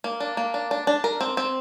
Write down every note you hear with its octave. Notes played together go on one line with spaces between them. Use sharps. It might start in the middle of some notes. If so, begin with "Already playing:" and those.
A#3
D4
A#3
D4
D4
D4
A#4
C4
C4